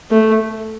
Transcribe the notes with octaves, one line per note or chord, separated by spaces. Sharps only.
A3